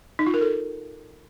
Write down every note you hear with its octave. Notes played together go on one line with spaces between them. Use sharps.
D#4
F4
A#4
A4